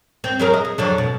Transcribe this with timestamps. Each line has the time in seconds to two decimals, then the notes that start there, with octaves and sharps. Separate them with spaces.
0.24 C4
0.39 F#3 G#4 A#4
0.54 D#5
0.65 G#4
0.78 F2 D3 F#3
0.98 B2